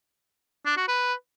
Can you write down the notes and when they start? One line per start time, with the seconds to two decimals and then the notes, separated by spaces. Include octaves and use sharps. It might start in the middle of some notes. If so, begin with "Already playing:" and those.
0.66 D4
0.77 F#4
0.88 B4